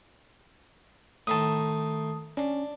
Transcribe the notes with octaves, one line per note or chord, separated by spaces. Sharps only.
A2 D#3 A5 D#6
C#4 D4